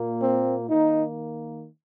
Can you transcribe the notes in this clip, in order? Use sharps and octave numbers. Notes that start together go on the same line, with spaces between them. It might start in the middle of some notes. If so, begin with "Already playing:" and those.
Already playing: A#2 A#3
C4
D#3 A#3 D#4